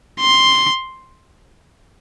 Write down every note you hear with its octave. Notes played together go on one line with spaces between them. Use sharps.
C6